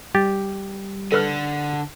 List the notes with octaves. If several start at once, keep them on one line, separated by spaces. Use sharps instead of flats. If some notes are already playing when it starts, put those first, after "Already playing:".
G3 G4 A6
D3 A4 B4 F6